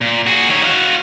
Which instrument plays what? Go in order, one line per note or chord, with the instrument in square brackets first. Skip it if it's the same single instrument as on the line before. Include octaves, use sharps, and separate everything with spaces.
[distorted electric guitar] A#2
F#4 G#4
D#3 C#5
F#4 F5